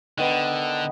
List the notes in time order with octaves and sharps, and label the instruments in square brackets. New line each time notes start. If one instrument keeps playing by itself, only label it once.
[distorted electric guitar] D3 [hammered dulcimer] D#3 B3 D#4